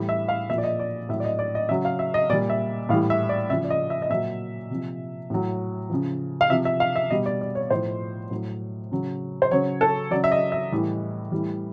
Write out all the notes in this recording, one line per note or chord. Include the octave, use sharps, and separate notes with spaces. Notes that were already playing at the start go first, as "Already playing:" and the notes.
Already playing: A2 E3 G3
E5
F5
A#2 F3 D5 E5
D#5
D5
A2 F#3 E5
D5
D#5
D5
D#5
C#3 F#3 E5
F5
E5
D#5
A#2 G3 D5
E5
A2 E3 G3 F5
E5
D5
C#3 F3 E5
D5
D#5
E5
D#5
A#2 F#3 E5
C3 F3
A2 F#3
C#3 F3
F5
C3 F3 E5
E5
F5
E5
B2 G3 D#5
D5
D5
C#5
A2 F3 C5
A2 F#3
C#3 F#3
C5
C#3 F#3 C#5
A4
C#3 F#3 D5
E5
D#5
E5
A2 E3 G3
A2 E3 G3